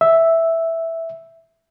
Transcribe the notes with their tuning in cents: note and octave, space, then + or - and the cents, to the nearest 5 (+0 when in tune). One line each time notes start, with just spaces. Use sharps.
E5 -5